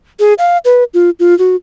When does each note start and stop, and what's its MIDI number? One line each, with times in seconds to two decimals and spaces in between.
0.19 0.34 68
0.38 0.58 77
0.65 0.84 71
0.94 1.10 65
1.19 1.37 65
1.38 1.56 66